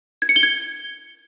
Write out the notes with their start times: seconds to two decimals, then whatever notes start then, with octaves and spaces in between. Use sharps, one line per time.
0.22 G#6
0.29 C#7
0.36 G7
0.43 G#6